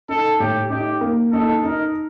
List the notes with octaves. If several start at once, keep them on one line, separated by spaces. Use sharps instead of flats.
D#4 A4
A2 G4
D#4 G4
A#3
D#4 A4
D#4 A#4